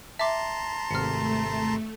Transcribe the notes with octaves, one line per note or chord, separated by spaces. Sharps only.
E5 A5 A#5 C6 D6
G#1 C3 A3 F6 C#7